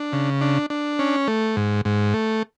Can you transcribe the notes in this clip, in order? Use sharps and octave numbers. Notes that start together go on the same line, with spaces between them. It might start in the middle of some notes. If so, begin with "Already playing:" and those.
Already playing: D4
C#3
D4
D4
C#4
A3
G#2
G#2
A3